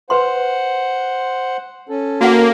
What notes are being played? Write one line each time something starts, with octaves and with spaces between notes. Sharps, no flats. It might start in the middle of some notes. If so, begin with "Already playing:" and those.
B4 C5 F#5 C6
C#4 A4
A#3 F#4 F#5